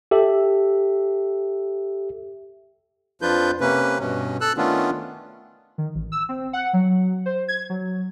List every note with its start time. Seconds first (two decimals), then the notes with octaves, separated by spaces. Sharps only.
0.11 G4 A4 E5
3.22 F2 F3 D4 F4 B4 G6
3.61 C3 A#3 C#4 B4
4.00 G2 B2 C#4
4.41 A4 E6 F#6
4.57 D#3 A3 B3 C#4 D4 F4
5.78 D#3
5.95 A1
6.12 E6
6.29 C4
6.53 F#5
6.73 F#3
7.26 C5
7.48 G#6
7.70 F#3